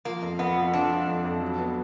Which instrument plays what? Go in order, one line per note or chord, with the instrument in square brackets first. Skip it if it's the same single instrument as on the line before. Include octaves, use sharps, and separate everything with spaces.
[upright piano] F3 [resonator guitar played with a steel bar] A#3
[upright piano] F2
[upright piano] F2 [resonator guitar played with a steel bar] B3
[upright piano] F3
[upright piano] F3 [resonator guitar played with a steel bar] D4
[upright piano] F3
F2
F2
F#3
B3